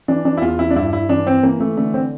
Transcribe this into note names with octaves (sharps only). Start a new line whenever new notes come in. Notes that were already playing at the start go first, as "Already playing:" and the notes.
E3 D4
E3 D4
E4
E2 F4
E2 E4
D4
G2 E4
G2 E4
E3 D4
E3 C4
E3 A#3
E3 A3
D3 A3
D3 C4